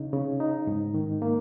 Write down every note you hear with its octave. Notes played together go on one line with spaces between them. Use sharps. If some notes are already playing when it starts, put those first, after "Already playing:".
Already playing: C#3 D#4
C#3
D#4
G#2
D#3
A#3